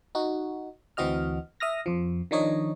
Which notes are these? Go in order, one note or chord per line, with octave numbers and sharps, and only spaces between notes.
D#4 F#4
D2 E3 C4 F#4 D#5 F6
E5 D#6 F6 A#6
F2 F3
D#3 F3 D4 D#4 C#5 D#5